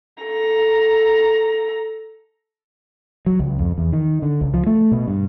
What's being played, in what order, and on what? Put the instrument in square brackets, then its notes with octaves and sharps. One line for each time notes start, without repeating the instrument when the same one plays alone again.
[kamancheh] A4 A#5
[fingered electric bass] F#3
C#2
F2
E2
D#3
D3
C#2
F3
A3
B2
G2